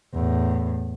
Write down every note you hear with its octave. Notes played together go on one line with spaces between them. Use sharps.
E2 A2